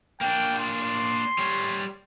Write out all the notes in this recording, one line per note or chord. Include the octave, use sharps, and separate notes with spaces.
A#3 D4 G5
C6
G3 C#5